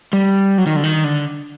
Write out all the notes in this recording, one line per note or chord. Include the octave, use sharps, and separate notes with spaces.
G3
F#3
D#3
D3
D#3
D3